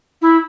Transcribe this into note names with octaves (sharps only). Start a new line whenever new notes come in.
E4